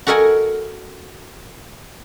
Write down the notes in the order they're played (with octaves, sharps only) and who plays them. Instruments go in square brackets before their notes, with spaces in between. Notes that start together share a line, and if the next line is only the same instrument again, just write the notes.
[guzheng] F#4 A4 A#4 D#5 F#5 G#5